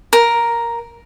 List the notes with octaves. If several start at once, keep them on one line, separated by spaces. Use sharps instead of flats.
A#4